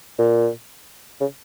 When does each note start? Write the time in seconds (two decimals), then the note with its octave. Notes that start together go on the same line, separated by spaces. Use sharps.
0.18 A#2
1.20 C#3